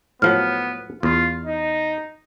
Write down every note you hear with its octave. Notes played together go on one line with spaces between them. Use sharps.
A2 F3 F#3 B3 F6
E2 F4
D#4